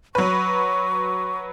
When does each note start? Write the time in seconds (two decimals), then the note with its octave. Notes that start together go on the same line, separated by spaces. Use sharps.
0.15 F#3 B4 C#6